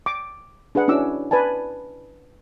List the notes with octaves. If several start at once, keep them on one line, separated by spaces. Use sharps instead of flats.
D6
D4 G#4 B4 F#5
C#4 D4 E4 F#4 D6 E6
B4 D5 G#5 A5